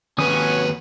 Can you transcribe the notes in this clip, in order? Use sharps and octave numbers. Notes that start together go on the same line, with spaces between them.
D#2 C#4 F#4 B4 D#6 D#7